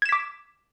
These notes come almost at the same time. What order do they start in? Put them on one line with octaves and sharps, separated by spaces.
G#6 E7 B6 D6